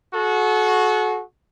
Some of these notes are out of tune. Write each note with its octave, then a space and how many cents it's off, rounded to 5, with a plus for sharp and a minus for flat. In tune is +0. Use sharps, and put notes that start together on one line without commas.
F#4 -10 A4 -40